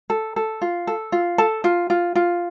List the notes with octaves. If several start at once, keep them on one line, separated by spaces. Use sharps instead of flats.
A4
A4
F4
A4
F4
A4 A5
F4
F4
F4